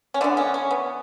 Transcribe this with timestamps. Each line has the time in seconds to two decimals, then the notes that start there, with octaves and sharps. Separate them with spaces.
0.14 C#4
0.21 D3 E3 B3 D4
0.37 C#4
0.54 C#4
0.71 B3